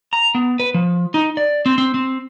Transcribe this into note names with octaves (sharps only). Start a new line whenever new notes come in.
A#5
B3
B4
F3
D#4
D5
C4
C4
C4